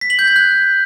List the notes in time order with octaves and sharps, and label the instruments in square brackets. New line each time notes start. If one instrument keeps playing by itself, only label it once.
[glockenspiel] B6
F#7
G6
G#6
F#6